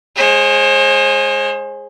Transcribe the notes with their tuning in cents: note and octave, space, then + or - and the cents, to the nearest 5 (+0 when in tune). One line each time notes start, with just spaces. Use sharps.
G#3 +0 C5 +40